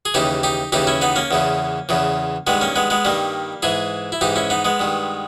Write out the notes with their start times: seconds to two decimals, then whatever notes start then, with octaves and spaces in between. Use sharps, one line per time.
0.05 G#4
0.14 D#2 C#3 E3 D#4 G4
0.43 D#4 G4
0.72 D#2 C#3 E3 D#4 G4
0.87 C#4 E4
1.01 B3 D#4
1.16 A#3 C#4
1.31 E2 C#3 E3
1.89 E2 C#3 E3
2.47 G2 D#3 G#3 B3
2.61 A#3 C#4
2.76 G#3 B3
2.90 G#3 B3
3.05 G2 D#3 G3 A#3
3.62 G#2 E3 E4 G#4
4.12 E4
4.21 G#2 E3 D#4 G4
4.36 C#4 E4
4.50 B3 D#4
4.65 G#3 B3
4.79 G2 D#3